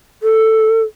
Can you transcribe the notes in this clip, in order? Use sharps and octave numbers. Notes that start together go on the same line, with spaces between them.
A4